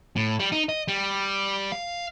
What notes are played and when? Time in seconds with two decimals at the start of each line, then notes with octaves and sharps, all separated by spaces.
0.16 A2
0.39 G3
0.52 D#4
0.69 D#5
0.88 G3
1.72 F5